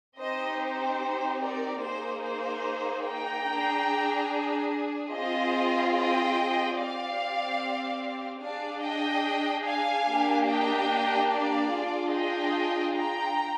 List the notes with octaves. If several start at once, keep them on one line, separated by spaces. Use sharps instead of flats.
C4 D#4 G4 C5 D#5
C5
A#4 D5
A#3 D#4 G#4 C5
C5
G5 A#5
D4 G#4
C4 F4 G#4 C5 D#5
D#5 G5
C4 G4 D5 F5
D4 G#4 D5 F5
D#5 G5
F5 G#5
A#3 D4 G4
D#5 G5
D5 F5
D4 F4 G#4
D#5 G5
G5 A#5